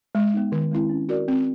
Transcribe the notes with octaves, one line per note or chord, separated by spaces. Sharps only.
G#3
B3 D#4
D#3
G#3 C4 E4
C#4
F#4 A#4 D5
C4